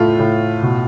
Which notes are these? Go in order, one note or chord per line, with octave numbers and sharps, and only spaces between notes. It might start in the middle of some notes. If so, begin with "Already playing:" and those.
Already playing: A2 A3 F4
A2
B2